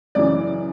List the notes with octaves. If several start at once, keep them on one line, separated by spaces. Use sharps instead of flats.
F#2 C#3 E3 D5